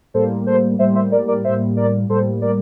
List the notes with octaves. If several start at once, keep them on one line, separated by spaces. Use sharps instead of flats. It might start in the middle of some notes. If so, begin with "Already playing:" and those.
A2 G3 A#3 A4 C5
A4 C5
A2 G3 A#3 C5 E5
C5 E5
A#4 D5
A#4 D5
A2 G3 A#3 C5 E5
A#4 D5
A2 G3 A#3 A4 C5
A#4 D5